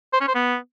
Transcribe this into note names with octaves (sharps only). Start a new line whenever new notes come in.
C5
C#4
C5
B3